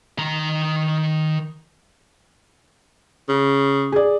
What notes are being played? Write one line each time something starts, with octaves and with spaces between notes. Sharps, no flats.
D#3 A#5
C#3
G#4 D5